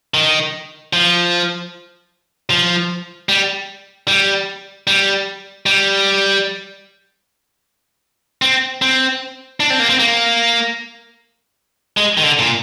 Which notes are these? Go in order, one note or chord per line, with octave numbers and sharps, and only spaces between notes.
D#3
F3
F3
G3
G3
G3
G3
C4
C4
D4
C4
A#3
C4
A#3
G#3
D#3
D3
A#2